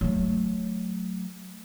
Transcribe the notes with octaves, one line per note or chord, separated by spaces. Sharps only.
F#3 A3